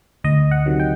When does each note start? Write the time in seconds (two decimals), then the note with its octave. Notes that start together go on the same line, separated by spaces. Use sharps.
0.24 D2 D#5
0.51 F#5
0.66 C3 D#3 F#3
0.80 G5